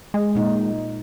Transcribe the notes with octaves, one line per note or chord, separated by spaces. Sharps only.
G#3
A#2 D#4